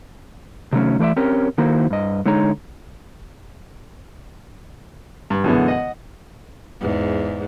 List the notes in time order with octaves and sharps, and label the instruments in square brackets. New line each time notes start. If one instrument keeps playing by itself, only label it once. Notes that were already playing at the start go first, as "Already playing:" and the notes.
[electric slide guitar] C3 D#3 F#3 A3 C#4
E3 A3 A#4 D5 E5
C4 C#4 G4 A#4
D#3 A#3 D#4 E4 F#4 C5
G2 D#5
D3 G#3 D#4 C#5 A#5
[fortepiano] G2
F#2 B2 D3 E3 G#3 B3
D#5 F#5
[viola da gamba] E2 G#2